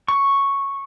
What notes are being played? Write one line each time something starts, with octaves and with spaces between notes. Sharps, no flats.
C#6